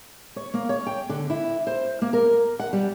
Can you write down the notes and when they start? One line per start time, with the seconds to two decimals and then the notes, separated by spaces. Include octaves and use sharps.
0.36 C#5
0.54 A#3
0.69 C#5
0.87 G5
1.09 D3
1.30 E4
1.67 C5
2.02 A#3
2.13 A#4
2.59 F#5
2.73 G3